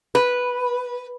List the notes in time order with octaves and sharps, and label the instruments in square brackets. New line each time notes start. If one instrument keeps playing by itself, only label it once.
[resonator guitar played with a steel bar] B4